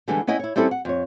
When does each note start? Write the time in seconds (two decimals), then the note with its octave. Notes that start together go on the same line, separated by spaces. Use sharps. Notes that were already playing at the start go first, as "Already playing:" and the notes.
0.08 D3 E3 G3 G#3 B3 D4
0.27 B3 C#4 E4 D#5 G5
0.39 E4 C#5
0.56 G3 C4 C#4 E4 G4 A4
0.71 F#5
0.85 F2 C#5